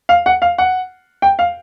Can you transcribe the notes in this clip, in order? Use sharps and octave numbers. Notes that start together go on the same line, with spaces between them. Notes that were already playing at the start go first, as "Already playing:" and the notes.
F5
F#5
F5
F#5
G5
F5